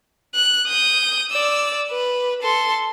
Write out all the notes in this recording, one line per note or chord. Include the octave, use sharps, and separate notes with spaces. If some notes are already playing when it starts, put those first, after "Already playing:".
F#6
D#6 G6
D5 E6
B4
A4 C6